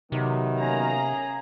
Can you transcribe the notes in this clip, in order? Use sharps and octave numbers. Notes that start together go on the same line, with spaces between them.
C3 D#3 F#3 B3
A#3 C#4 G#4 A#5